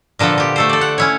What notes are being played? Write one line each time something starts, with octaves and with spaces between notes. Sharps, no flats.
A#2 D3 F3 B3 A4
F3 G4
A3 A4 C5
A4 D5
F#5
C#4 E4 C#5